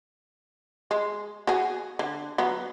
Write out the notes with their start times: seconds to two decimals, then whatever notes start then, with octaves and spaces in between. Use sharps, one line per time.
0.91 G#3
1.47 F#4 G#4
1.99 D3
2.38 F#3 B3